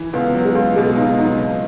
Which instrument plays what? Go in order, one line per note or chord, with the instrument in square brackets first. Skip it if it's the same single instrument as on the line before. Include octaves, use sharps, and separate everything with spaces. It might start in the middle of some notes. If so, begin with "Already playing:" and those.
Already playing: [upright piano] E3
[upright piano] C#2 [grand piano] B3
[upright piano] F#3
[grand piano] G#3
[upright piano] C#2
[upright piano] B2 [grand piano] G#3
[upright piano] C#2 [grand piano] D#4
[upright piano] F#3 [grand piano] D#4
[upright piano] C#2